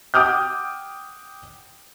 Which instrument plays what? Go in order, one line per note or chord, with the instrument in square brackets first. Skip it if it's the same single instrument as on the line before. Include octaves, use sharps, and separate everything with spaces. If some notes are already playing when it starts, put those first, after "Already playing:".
[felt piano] F#5 G5 D6 D#6 F6 G6